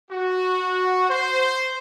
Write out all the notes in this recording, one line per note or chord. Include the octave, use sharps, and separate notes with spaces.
F#4
C5